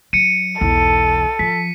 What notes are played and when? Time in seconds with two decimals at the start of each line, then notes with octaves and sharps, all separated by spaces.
0.13 F#3 C#7 D#7
0.61 B1 E2 A4
1.39 F3 B6